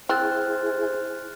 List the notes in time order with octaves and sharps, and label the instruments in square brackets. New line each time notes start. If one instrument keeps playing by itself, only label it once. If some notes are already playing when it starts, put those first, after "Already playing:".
[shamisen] C4 [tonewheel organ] E4 G#4 [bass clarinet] C5 [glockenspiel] F6 F#6 A6